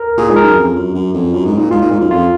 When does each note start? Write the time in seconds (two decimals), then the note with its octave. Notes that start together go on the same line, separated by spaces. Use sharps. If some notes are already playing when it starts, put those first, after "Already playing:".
Already playing: A#4
0.18 A#2 G#4
0.30 G#2
0.36 A#4
0.43 F#2
0.56 F2
0.76 F#2
0.94 F#2
1.14 F2
1.33 F#2
1.46 G#2
1.59 A#2
1.71 G#2 F4
1.81 A#2
1.91 G#2
2.01 F#2
2.10 F2 F4